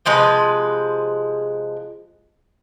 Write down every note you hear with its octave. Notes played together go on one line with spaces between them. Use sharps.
C3 F3 G#3 B4